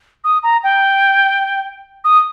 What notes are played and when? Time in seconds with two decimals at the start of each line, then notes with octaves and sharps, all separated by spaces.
0.24 D#6
0.43 A#5
0.63 G5
2.04 D#6